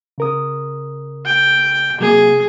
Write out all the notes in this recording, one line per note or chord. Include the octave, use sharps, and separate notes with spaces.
C#3 A#4 D#6
G5
C3 F#3 A#3 G#4